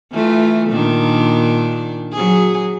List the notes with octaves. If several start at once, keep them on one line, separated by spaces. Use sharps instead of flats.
E3 A3 F4
A#2 D#3 D4
F#3 G#4